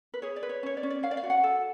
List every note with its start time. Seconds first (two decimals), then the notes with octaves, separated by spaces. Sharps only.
0.14 B4
0.22 G#4 C#5
0.36 D5
0.43 B4
0.49 C#5
0.63 C#4 C#5
0.77 D5
0.83 C#4
0.90 D5
1.03 C#4 F5
1.11 D5
1.17 F5
1.24 F#4
1.30 F#5
1.43 A4